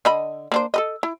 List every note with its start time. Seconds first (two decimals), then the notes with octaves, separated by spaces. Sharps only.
0.05 D3 D#5 B5
0.52 A#3 D4 C5
0.74 A4 B4 D#5
1.03 E4